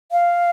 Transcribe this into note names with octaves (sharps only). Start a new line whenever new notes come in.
F5